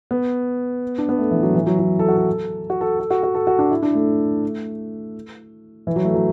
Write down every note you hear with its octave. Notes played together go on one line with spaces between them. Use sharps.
B3
D4
B3
A3
E3
F#3
E3
F#3
F#3
A4
F#4
A4
F#4
A4
A4
F#4
F#4
A4
F#4
D4
E4
D4
A3
E3
F#3
A3
F#3